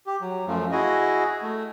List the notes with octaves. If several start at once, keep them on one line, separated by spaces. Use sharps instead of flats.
G4
F#3
F#2 F3 A3
E4 F#4 G#4 D#5
A3